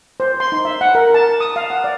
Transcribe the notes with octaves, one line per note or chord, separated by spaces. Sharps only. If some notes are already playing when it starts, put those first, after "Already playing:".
C5
C6
D#4
E5
F#5
A#4
A5
D#6
F5
F#5
D5